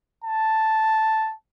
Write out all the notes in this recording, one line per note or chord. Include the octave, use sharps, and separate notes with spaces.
A5